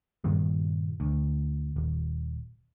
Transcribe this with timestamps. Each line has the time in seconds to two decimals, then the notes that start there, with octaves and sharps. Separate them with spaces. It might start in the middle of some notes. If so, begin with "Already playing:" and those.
0.24 G2 A#2 D#3 G3
1.00 D2
1.76 D#1